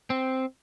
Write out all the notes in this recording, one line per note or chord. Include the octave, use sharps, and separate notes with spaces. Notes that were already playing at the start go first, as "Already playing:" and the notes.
C4